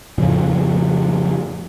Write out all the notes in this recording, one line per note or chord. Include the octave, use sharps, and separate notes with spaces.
F2 A2 C#3 F3